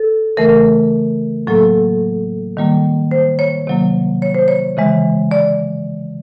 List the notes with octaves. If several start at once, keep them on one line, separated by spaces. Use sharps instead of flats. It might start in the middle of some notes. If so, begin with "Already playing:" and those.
Already playing: A4
C#3 E3 A3 A#4
A2 F#3 A#3 A4
D#3 G3 A#3
C5
C#5
C3 D#3 F#3 A#3
C#5
C5
C#5
C#3 E3 G#3
D5